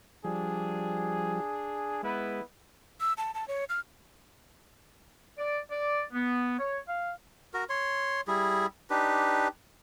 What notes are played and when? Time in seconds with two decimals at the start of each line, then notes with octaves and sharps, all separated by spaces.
0.25 F3 G3 D4 G#4
2.03 G#3 B3 E4 B4
3.01 E6
3.18 A5
3.34 A5
3.48 C#5
3.69 F6
5.38 D5
5.71 D5
6.13 B3
6.59 C#5
6.88 F5
7.54 F#4 A#4
7.70 C#5 C6
8.28 G3 E4 G#4
8.90 D4 D#4 G4 B4